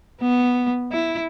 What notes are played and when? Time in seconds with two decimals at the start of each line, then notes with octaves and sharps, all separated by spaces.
0.21 B3
0.92 E4